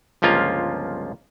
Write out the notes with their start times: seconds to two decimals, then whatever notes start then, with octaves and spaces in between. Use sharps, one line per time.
0.22 G1 C#2 F3 A#3 F4 F5